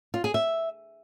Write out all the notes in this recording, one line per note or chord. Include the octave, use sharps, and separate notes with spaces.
F4
G#4
E5